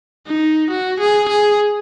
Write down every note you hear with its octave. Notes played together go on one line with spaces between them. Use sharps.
D#4
F#4
G#4
G#4